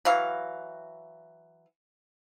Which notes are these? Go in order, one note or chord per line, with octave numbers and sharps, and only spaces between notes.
E3 F#3 F5